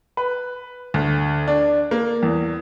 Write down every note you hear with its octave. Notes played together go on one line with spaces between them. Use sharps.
B4
D2
D4
A#3
E2